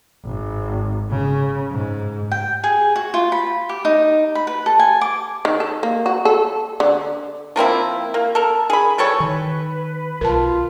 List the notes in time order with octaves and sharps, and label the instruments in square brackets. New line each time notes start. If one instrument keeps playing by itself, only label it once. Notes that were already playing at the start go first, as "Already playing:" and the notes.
[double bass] G#1
C#3
G#2
[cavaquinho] G5
G#4
F#4
F4
B5
G4
D#4
B5
B4
A4
G#5
D6
[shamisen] D#3
A4
A#3
F#4
A4
D3
[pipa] F3 A#3 C4 E4
A#3
A4 A#4
G#4 B5
E3 G3 A4 C#5
[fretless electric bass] D#3 [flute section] B4
[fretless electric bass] B1 [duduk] F4 [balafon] A#4 A5